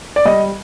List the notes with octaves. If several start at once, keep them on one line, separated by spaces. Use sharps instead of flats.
D5
G3 D#5